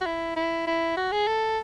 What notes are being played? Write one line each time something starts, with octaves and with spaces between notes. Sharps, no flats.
F#4
E4
E4
E4
F#4
G#4
A4